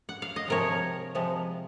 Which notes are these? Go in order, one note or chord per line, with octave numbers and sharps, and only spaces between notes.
F#5
F5
D#5
C3 F3 G#3 A#4 C#5
C3 F3 G#3